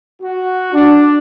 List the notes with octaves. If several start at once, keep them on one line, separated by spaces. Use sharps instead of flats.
F#4
D4